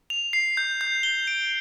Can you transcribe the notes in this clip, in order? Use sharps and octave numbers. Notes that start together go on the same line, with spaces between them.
F7
C7
G6
G6
G7
D7